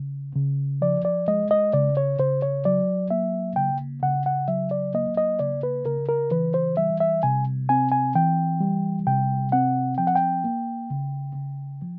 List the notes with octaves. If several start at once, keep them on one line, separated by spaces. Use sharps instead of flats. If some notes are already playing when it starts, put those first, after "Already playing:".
Already playing: C#3
C#3
F3 D5
D5
G#3 D#5
D#5
C#3 D5
C#5
C#3 C5
C#5
F#3 D5
A#3 E5
C#3 G5
C#3 F#5
F#5
F#3 E5
D5
A#3 D#5
D#5
C#3 D5
B4
C#3 A#4
A#4
E3 B4
C5
G3 E5
E5
C3 G#5
C4 G#5
G#5
E3 G5
G3
C3 G5
C4 F#5
F3 G5
F#5
G5
A#3
C#3
C#3
F3